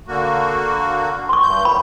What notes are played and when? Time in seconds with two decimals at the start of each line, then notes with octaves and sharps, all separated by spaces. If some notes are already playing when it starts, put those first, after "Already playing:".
0.08 D3 A#3 F#4
1.29 C6 C#6
1.43 G2 G6
1.65 F#2 B5